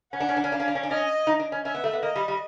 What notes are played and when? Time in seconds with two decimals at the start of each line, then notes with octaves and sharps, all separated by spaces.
0.13 C#4 F#5
0.20 D4
0.29 C#4
0.37 D4
0.44 C#4
0.51 D4 F5
0.60 C#4
0.68 D4
0.75 C#4
0.83 D4
0.89 C#4 D#5
1.27 D#4
1.40 D4
1.52 C#4
1.64 C#4 E5
1.74 B3
1.84 A3
1.93 B3
2.03 A#3 D#5
2.16 G3
2.28 G3